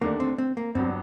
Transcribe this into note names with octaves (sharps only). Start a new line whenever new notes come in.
D#2 D3 A3 A#3 D4
C4
C4
A#3
G1 G2 F#3 C4